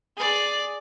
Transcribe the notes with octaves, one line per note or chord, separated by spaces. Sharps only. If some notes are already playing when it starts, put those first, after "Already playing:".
G#4 D5